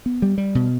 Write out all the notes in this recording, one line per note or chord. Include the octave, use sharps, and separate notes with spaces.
B3
G3
G3
B2